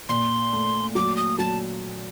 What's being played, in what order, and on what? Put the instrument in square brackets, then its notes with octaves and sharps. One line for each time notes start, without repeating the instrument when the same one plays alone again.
[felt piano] A#2 [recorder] C6
[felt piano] A3
[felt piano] F#3 [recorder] D6
[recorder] D#6
[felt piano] F#3 [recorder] A5